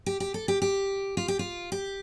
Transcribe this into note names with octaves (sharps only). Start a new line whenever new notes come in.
G4
G4
A4
G4
G4
F4
G4
F4
G4